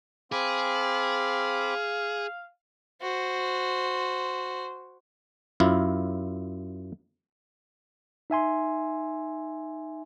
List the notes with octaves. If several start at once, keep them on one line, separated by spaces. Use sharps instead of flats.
C4 G#4 F5 B5 D6
F#4 C5
F#2 E4 F4
D#4 E5 G#5 C6